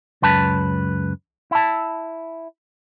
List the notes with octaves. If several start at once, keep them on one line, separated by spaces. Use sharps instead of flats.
C#2 F#2 B4 A5
E4 A5